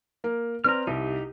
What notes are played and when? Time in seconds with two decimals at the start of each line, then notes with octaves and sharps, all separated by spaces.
0.24 A#3 A#4
0.64 C4 B4 D5 A#5 F6
0.87 C2 D#4 G4